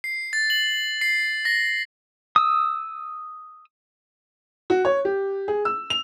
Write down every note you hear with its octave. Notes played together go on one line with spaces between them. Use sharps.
C7
A6
F#7
C7
A#6
D#6 E6
F#4
C#5
G4
G#4
E6
F7